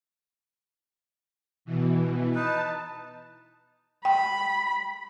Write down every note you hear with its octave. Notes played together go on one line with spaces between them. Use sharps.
B2 E3
D#4 B4 A5
G5 B5